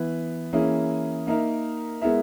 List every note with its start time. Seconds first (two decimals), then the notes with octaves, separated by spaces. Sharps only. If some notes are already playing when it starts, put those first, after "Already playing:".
Already playing: E3 B3 E4 B4
0.53 E3 A#3 C#4 E4 G#4
1.27 A#3 D#4 A#4 E5
2.02 G#3 B3 E4 A#4 E5